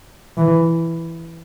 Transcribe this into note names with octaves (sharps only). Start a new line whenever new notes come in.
E3